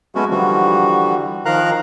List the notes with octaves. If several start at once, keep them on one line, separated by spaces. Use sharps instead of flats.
F#3 G#3 A3 B3 C#4 F#4
D3 E3 F3 G3 F#4
D#3 F3 A#4 F5 A#5 F#6